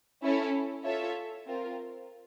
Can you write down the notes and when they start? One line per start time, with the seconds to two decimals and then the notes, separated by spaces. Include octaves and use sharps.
0.22 C#4 E4 A4 C#5
0.84 F4 A4 C#5 E5
1.46 C4 F4 A#4